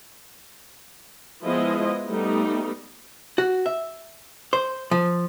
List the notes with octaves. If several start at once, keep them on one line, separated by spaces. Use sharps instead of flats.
F3 G#3 B3 E4 F4 D#5
G3 A3 B3 D#4
F#4
E5
C5
F3